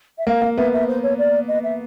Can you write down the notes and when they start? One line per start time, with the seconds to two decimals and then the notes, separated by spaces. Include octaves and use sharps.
0.18 E5
0.27 A#3 F5
0.42 A#3
0.57 B3 E5
0.73 E5
0.88 C5
1.03 C#5
1.18 D5
1.48 D#5
1.63 E5